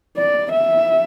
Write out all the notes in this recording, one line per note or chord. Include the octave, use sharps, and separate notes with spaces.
D5
E5